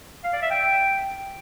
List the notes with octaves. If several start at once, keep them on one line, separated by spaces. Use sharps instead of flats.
F5
D5
E5
G5